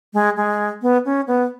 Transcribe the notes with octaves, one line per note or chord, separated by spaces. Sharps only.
G#3
G#3
B3
C#4
B3